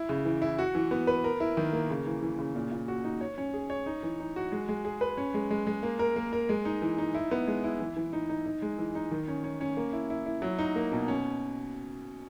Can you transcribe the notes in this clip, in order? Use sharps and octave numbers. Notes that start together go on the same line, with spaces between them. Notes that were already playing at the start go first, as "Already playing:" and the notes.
Already playing: E4
C#3
E3
E4
F#4
E3
B3
B4
A#4
E4
D#3
A#3
C#3
E3
E3
C#3
A#2
A#2
F#4
D#4
C#5
C#4
G#4
C#5
D#4
E3
D#4
F#4
G#3
G#3
G#4
B4
C#4
G#3
G#3
G#3
A#3
A#4
A#3
A#4
G#3
D#4
E3
D#4
E4
B3
G#3
E4
E3
E3
D#4
D#4
D#4
G#3
E3
D#4
D#3
C#4
C#4
C#4
A#3
E4
E4
E4
F#3
D#4
A#3
B2
C#4